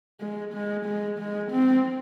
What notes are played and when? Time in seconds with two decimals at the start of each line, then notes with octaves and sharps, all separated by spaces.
0.21 G#3
0.54 G#3
0.85 G#3
1.19 G#3
1.51 C4